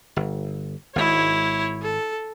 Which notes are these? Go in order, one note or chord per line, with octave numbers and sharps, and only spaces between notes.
G1
G#1 G#2 E4 C#5
A4